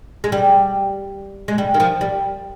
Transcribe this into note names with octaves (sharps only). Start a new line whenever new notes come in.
G#3
G3
G#3
G3
D#3
F3
G3